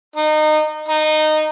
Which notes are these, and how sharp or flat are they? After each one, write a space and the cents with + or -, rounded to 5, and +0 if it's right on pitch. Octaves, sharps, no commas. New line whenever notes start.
D#4 -25
D#4 -15